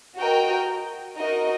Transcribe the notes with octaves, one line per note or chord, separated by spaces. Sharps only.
F#4 A#4 D#5 G5
D#4 F#4 A#4 D#5